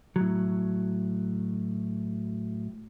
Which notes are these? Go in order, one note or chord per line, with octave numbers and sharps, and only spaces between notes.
A2 F#3